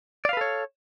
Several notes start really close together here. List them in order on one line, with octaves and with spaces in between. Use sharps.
D5 F5 B4 A4 C#5